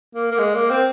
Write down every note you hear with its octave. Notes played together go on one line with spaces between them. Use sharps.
A#3
A#3
G#3
A#3
C4